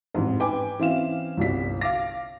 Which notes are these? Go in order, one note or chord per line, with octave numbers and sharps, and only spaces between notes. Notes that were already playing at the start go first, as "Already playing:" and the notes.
A1 F2 G#2
B4 G5 G#5 D6
E3 C4 C#4 F5 E7
G1 C2 G3 B6
F5 D6 A#6